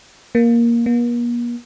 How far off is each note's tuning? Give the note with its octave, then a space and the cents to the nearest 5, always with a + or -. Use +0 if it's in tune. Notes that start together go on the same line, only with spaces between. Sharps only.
A#3 +10
A#3 +45